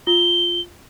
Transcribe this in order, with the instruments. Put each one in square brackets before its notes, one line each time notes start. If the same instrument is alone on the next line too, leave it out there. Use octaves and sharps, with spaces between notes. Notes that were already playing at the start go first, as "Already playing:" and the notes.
[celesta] F4 [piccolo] G7